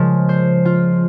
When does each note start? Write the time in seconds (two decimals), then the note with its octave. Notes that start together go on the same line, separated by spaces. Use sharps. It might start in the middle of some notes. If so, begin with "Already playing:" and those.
Already playing: C#3 F3 G#3
0.29 C5
0.65 F4